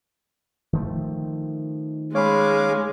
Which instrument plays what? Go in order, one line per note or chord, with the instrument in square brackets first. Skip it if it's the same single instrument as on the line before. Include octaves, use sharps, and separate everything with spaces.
[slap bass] D#3 F3 A3
[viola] G#3 [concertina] C#4 F5 D6 [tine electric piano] C#5 B5